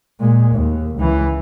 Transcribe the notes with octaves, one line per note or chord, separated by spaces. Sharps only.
A#2 G#3
D#2
C#2 E3